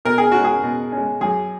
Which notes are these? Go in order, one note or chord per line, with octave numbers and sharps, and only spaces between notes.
B2 A#4
G#4
G#3 C#4 F#4
G#4
B2
G#3 C#4
F#2 G#4